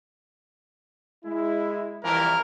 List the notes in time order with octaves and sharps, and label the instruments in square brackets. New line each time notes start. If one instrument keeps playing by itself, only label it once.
[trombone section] G#3 E4
[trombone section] C2 F2 E3 [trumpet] A#4